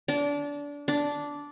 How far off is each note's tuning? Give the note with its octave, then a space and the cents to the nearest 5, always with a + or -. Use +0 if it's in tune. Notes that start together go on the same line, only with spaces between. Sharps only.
D4 -25
D4 -10